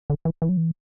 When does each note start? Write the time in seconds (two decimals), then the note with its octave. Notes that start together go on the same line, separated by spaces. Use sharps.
0.10 D3
0.25 E3
0.42 E3
0.49 F#3
0.57 E3